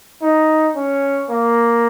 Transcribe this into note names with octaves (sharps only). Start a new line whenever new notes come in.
D#4
C#4
A#3